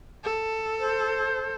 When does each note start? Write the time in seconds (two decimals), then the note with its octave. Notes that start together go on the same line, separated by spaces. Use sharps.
0.24 A4
0.80 C5